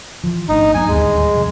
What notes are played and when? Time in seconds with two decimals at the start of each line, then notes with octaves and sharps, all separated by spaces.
0.24 E3 F3
0.49 G#1 A3 D4 D#4
0.75 G2 F#3 B3 G#5
0.88 D1 D#2 G3 G#3
1.33 F2 C3